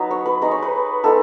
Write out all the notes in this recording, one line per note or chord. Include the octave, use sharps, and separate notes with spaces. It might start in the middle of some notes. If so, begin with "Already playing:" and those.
Already playing: F#3 B3 D#4 B4
C#5
B4
G#3 D#4 D#5
C#5
B4
G#3 B3 D#4 A4